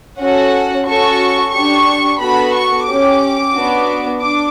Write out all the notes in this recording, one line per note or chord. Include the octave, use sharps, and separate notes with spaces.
C#4 F#4 A4 F#5
C#4 F#4 A4 C#6
D4 G4 C#6
B3 F#4 A4 B5
C#6
C#4 G4 D6
B3 D4 F#4
D4 D6